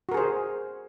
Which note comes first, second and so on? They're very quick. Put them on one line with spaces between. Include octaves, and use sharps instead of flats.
F#4 A#4 G#4 C5